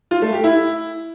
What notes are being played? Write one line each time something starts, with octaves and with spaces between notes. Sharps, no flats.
F4
A3
G4
E4